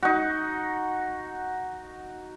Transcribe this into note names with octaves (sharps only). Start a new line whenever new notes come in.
D#4 F#4